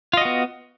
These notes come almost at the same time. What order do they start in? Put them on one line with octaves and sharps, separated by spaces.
F4 D#5 F#4 B3